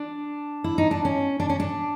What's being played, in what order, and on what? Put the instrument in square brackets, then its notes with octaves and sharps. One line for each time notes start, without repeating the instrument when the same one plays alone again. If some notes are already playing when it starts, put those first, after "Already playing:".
Already playing: [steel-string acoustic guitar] D4
E4
D#4
D4
C#4
D4
C#4
D4